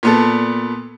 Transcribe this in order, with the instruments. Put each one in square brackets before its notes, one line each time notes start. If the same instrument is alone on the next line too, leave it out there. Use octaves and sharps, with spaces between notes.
[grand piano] A#2 B3 A4